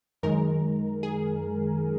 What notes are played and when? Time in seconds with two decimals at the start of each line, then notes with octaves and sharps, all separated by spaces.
0.23 F#2 D#3 G#3 A#4
1.03 G#4